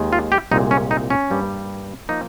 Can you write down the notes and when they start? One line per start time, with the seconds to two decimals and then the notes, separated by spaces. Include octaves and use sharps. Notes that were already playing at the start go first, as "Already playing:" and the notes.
Already playing: D#2 D#3 G#3
0.13 F4
0.32 G4
0.51 C2 A#2 G#3 D#4
0.71 C#4
0.91 D#4
1.10 C#4
1.30 G2 G3 A#3
2.09 F3 A#3 D#4